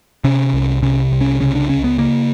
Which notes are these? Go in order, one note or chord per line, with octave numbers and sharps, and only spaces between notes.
C3 C#4
C2
C3 C#4
C2
C#4
C#3 C#4
D4
C#2 C#4
B3
C#3 A#3